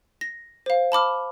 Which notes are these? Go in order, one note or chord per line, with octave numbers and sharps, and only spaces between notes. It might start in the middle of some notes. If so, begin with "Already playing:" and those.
A#6
C5 F5
A5 B5 D6 F6